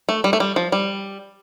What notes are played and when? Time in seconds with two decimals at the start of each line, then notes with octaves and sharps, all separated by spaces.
0.09 A3
0.24 G3
0.33 A3
0.40 G3
0.56 F3
0.72 G3